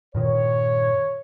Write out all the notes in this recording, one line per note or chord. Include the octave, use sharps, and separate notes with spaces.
G2 A#2 D#3 C#5